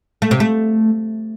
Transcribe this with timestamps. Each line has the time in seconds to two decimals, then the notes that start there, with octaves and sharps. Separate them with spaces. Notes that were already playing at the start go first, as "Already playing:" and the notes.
0.22 A3
0.31 C3
0.40 A3